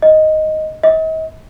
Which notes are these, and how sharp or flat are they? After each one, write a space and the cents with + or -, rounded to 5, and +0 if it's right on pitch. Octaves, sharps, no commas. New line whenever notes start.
D#5 +5
D#5 +45